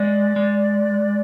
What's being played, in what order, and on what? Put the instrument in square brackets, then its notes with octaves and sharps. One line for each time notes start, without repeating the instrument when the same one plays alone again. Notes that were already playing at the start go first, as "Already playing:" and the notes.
Already playing: [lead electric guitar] G#3 [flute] D5
[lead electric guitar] G#3